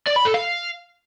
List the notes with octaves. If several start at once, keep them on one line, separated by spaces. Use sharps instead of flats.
D5
B5
A4
F5